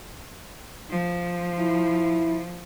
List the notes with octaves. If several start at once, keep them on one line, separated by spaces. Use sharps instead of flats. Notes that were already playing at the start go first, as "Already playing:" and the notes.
F3
E4